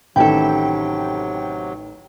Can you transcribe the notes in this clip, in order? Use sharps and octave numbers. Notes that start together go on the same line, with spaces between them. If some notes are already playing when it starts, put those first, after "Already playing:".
A1 C3 D#3 F#3 E4 G4 A4 G5